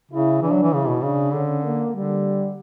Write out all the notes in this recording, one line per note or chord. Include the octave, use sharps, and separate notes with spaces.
C#3 E4
E3 D4
F#3
E3
C#3 E4
B2
C#3 D4
D3 C#4
A#3
D3 G3